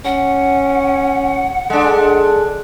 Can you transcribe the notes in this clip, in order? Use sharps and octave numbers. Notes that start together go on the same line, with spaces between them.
C#4 F#5
G#3 D4 A4